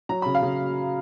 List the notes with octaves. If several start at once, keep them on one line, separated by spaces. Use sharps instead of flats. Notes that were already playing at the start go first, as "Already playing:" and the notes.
F#3 A#5
C#3 B5
F5
C#3